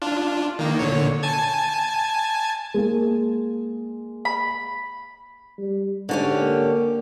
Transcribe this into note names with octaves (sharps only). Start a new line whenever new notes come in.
D4 F4
D#3 A#3
A#2 D3 C#5
G#5 A5 G#6
G#3 A#3
B5
G3
G#2 D3 C#4 G4
A#3